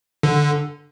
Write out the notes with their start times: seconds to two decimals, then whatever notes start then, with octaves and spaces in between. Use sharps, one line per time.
0.23 D3